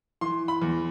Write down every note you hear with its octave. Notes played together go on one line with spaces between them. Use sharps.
E3 C6
B5
E2